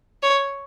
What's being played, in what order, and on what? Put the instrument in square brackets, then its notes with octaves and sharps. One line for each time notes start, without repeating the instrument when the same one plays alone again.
[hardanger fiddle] C#5